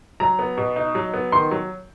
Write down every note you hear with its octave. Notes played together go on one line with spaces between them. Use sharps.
F#3 A#5
B3
B2
D#4
F#3
B3
D#3 C6
F#3